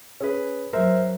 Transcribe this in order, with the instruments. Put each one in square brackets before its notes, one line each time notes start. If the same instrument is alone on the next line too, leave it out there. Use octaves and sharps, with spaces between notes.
[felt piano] C#4 G#4 B4
[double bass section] F#2 F#3 [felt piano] A#4 C5 E5